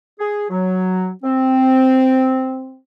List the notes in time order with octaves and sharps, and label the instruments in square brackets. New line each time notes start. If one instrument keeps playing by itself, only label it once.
[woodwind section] G#4
F#3
C4